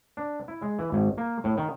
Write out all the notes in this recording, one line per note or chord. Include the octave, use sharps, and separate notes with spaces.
D4
E4
G#3
E3
G#1
A#3
A2
D#3